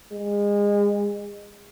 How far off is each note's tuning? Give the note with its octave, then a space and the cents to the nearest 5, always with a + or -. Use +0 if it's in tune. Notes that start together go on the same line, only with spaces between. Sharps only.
G#3 -30